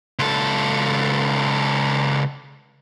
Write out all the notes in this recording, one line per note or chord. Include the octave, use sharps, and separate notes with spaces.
C#2 A4